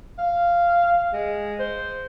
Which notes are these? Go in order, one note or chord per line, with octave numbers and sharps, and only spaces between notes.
F5
G#3
C5